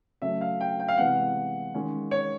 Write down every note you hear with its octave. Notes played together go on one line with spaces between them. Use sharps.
C#3 F#3 A3 E5
F5
G5
G5
F5
C3 E3 G#3 B3 F#5
D#3 G#3 C#4
C#5